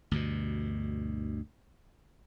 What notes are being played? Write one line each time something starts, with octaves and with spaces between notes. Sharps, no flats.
D2 G2 B2